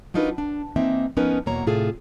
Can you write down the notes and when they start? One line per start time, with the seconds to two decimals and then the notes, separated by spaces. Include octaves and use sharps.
0.14 F#3 D4 D#4 F4 A#4 B4
0.38 D4
0.76 E3 A#3 C4 D#4 E5
1.17 F3 B3 C#4 D#4 A#4 B4
1.46 E2 B2 F#3 A#3 C#5 A#5
1.67 A2 C3 F4 G#4 A4